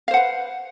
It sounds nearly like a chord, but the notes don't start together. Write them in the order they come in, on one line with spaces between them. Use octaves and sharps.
F5 C5 F#5 B4